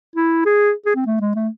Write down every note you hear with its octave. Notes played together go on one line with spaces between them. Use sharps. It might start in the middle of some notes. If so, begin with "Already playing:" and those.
E4
G#4
G#4
C4
A3
G#3
A3